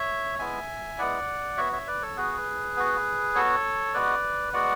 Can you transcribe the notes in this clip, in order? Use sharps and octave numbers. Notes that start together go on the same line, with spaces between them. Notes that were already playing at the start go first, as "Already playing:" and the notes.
Already playing: C#5 E5
G#3 B3 E4 E5 G#5
G#3 B3 E4 D5 F#5
B3 F#4 C#5 E5
C#5 E5
B4 D5
A4 C#5
B3 F#4 G#4 B4
B3 F#4
B3 F#4 A4 C#5
G#3 B3 F#4 B4 D5
G#3 B3 F#4 D5 F#5